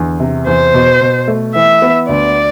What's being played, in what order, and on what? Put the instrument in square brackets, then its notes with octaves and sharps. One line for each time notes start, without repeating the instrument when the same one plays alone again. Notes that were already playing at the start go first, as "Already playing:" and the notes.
Already playing: [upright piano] E2 D3
C3
[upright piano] E2 [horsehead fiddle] C5
[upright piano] B2
B2
A3
[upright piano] E3 [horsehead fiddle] E5
[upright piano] B3
[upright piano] D2 [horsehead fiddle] D5